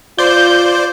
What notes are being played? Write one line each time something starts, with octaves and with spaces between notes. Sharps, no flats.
F4 C5 D5 G6